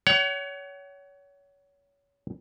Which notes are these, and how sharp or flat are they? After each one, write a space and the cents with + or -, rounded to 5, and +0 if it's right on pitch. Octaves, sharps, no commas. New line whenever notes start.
C#5 +25 F#5 +40